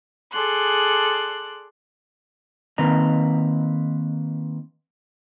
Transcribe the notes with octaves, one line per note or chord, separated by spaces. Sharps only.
G#4 A4 D5 C6 F#6
D#3 A#3 C4 B4 D#5 A#5